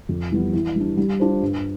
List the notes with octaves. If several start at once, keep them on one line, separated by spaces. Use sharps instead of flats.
F2
E3 G3 B3
E3
G3 D4
G3
D4 F4 C5
G2